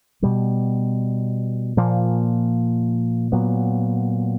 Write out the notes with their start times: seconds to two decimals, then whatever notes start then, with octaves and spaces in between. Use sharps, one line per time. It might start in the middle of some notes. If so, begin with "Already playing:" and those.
0.22 B2 G3 B3
1.77 A#2 F3 A#3
3.32 A#2 F#3 B3